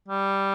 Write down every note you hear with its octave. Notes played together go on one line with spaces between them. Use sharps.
G3